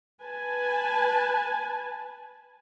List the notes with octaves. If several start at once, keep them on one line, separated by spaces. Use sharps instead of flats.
B4 G#5 A5